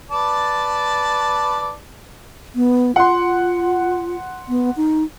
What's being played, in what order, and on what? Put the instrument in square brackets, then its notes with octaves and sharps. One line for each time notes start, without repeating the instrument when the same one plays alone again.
[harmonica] B4 D5 A5
[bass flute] B3
[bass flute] F4 [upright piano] F#5 C6
[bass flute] B3
D#4